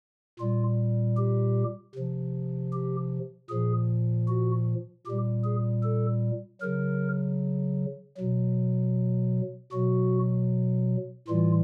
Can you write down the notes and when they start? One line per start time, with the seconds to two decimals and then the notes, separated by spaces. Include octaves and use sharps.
0.39 A#2 G3 F4
1.17 G4
1.95 C3 F3
2.73 G4
3.50 A#2 F3 G#4
4.28 F#4
5.06 A#2 G3 G4
5.45 G#4
5.83 A4
6.61 C#3 F#3 A#4
8.17 B2 F#3
9.72 B2 F#3 F#4
11.28 A2 E3 G3 F4